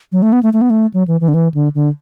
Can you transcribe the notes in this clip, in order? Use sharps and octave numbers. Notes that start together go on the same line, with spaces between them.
F#3
A3
B3
A3
A3
B3
A3
F#3
E3
E3
D3
E3
D3
D3